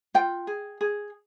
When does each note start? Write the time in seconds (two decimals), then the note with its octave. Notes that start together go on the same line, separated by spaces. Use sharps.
0.14 F4 G5
0.47 G#4
0.81 G#4